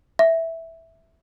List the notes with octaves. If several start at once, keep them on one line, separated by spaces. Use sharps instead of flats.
E5